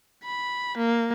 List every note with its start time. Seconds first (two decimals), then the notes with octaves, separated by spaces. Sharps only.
0.24 B5
0.77 A#3